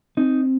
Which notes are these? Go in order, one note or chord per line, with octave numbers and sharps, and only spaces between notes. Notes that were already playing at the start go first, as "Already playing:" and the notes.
C4 D#4